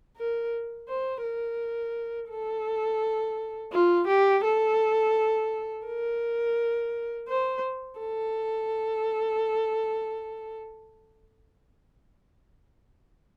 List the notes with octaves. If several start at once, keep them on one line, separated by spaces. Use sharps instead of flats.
A#4
C5
A#4
A4
F4
G4
A4
A#4
C5
A4